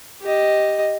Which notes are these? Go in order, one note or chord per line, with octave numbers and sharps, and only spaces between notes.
G4 D#5